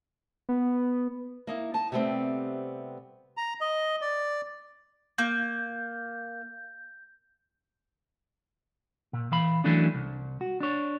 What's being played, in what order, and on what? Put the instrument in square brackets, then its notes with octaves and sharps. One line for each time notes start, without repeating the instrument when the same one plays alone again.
[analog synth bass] B3
[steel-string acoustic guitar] A#3 D#4 E4
D#4 A5
C3 G3 A3 B3 C4
[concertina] A#5
D#5
D5
[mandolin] A#3 [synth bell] G6
[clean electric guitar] A#2
E3 F5 B5
E3 F#3 A3 C#4 D4 E4
C2
F#4
D4 C#5